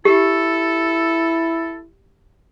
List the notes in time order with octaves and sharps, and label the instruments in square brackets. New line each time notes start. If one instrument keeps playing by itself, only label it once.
[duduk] E4 [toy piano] G4 [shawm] A4